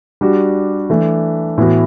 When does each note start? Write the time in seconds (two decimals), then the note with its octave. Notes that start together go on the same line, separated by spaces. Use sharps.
0.21 G3 D4 F#4
0.90 E3 A3 D4
1.58 A2 E3 B3 F#4